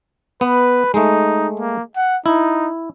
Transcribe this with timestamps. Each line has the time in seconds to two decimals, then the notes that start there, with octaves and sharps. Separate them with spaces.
0.41 B3 B4
0.94 G#3 A3 D#4
1.60 A#3
1.96 F#5
2.26 D#4 E4